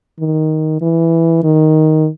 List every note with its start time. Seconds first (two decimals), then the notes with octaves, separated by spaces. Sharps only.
0.20 D#3
0.81 E3
1.44 D#3